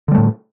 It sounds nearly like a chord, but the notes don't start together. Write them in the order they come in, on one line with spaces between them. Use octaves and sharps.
D3 G3 A3 A2